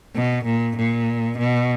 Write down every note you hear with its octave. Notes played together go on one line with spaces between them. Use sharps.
B2
A#2
A#2
B2